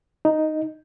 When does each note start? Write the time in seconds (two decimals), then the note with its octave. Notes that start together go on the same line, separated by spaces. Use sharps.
0.25 D#4